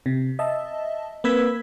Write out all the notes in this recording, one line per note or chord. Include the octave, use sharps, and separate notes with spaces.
C3
D#5 E5 A5
A#3 C4 B4 E6 G#6 B6